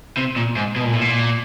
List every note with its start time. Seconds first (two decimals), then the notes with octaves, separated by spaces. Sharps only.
0.17 C3
0.36 A#2
0.56 G#2
0.76 B2
0.84 A#2
0.92 A2
1.01 A#2